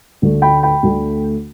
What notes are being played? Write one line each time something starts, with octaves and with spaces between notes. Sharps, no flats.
D2 D3 A3
G5 B5
G5 B5
D2 D3 A3